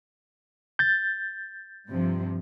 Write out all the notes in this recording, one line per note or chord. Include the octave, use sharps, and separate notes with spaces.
G6 A6
G2 C3 F3